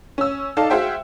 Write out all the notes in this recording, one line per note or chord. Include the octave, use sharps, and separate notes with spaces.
C#4 E6
D#4 A4 D5 F5 A5
F#4 G#4 C5 E5 F5 G5